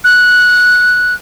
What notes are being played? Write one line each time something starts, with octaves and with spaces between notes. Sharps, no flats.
F#6